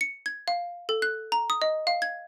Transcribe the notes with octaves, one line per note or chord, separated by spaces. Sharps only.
C#7
G#6
F5
A4
F#6
A#5
D#6
D#5
F5
G#6